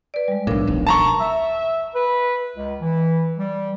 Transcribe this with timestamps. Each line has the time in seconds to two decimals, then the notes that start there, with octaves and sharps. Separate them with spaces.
0.14 B4 D5
0.28 G3 G#3
0.47 B1 A2 F3 D4 A#4
0.67 D#1 B1
0.87 A5 A#5 C#6
1.20 E5
1.95 B4
2.56 C#2
2.82 E3
3.38 G3